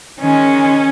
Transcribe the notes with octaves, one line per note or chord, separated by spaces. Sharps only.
D#3 G#3 C#4